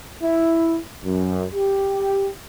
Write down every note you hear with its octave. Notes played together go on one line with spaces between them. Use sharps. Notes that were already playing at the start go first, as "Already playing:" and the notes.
E4
F#2
G4